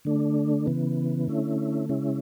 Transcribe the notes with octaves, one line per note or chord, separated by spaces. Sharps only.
D3 A3 D4
C#3 E3 B3
D3 A3 C#4 E4
C#3 G#3 C#4 E4